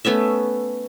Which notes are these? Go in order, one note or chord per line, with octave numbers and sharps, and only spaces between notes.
A3 B3 C#4 E5